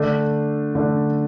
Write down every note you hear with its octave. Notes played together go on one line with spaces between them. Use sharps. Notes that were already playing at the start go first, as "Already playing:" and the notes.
Already playing: D3 A3 D4
D3 A3 D4